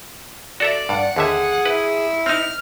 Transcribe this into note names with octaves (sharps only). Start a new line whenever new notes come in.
F#4 A4 D5 E5
G2 F#5
D#2 D3 G#4 E5
E4 B4
C4 D#4 F6